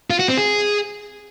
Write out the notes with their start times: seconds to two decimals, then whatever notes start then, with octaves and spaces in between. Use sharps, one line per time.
0.10 F4
0.19 F#4
0.28 C4
0.38 G#4